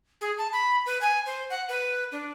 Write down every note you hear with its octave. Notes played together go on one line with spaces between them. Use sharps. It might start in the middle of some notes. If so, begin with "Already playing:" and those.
G#4
A5
B5
B4
G#5
C5
F#5
B4
D4